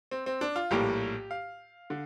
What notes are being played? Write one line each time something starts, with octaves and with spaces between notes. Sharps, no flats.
C4
C4
D4
F4
A#1 A2 G3 A#3 G4
F5
D3